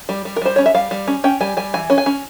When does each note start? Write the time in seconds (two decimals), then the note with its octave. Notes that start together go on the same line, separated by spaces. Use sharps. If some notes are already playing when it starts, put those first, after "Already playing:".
0.09 G3
0.25 G3
0.36 A#4
0.42 G3 C5
0.56 C#4 C#5
0.66 E5
0.74 G3 F5
0.91 G3
1.08 C#4
1.24 C#4 G5
1.40 G3 G#5
1.57 G3 G#5
1.74 E3 G#5
1.90 C#4
1.98 G#5
2.06 C#4